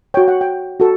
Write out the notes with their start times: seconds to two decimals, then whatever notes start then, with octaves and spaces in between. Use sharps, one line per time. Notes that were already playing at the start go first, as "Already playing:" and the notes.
0.14 F#4 C#5 G5
0.28 F#5
0.41 G5
0.80 F#4 A4